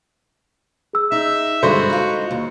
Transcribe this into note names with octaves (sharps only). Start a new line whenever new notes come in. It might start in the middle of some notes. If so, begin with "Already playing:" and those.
G#4 E6
D#4 E5
G2 D3 G#3 F#4 A4 C5 B5
D#4 F4
D#2